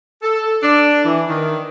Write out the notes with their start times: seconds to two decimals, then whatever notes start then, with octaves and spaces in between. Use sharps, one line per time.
0.22 A4
0.62 D4
1.05 E3
1.27 D#3